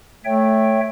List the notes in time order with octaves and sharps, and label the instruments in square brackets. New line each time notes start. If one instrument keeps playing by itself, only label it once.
[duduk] A3 [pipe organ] C#5 E5 G5